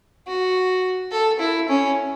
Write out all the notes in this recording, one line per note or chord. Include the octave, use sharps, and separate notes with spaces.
F#4
A4
E4
C#4